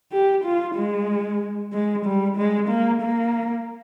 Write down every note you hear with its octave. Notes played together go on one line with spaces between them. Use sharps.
G4
F4
G#3
G#3
G3
G#3
A#3
A#3